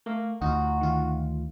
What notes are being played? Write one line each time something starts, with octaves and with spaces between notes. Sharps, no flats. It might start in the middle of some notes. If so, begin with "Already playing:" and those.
A3 A#3
D2 D#4 F4 F#4
D#3 F4